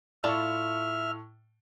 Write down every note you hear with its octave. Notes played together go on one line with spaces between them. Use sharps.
A2 E4 F4 D5 E5 A5 C#6 F6